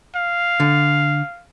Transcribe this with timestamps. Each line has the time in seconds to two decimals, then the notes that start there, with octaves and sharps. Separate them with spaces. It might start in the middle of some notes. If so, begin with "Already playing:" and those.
0.16 F5
0.60 D3